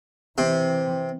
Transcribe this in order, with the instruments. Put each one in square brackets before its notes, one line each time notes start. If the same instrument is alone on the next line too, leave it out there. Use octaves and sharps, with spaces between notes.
[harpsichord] C3 [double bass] E3 C4